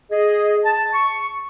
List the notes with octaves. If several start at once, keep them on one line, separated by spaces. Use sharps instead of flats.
G#4 D#5
A5
C#6